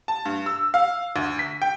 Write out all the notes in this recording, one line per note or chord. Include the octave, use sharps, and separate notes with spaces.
A5
G2
E6
F5
D2
B6
G5